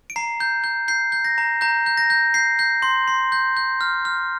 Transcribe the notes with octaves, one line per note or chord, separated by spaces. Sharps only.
D7
A#5 C7
G6
G6
G6 C7
G6
A#6
A#5
A#5 G6
G6
A#6
G6
G6 C7
G6
C6
C6
G6
G6
F6
F6